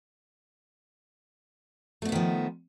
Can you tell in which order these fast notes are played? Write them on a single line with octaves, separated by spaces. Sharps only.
A3 B2 B3 D#3 F3